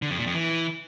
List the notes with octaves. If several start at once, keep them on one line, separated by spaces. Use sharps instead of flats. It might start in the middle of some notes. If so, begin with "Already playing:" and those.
D3
F2
A#2
F2
E3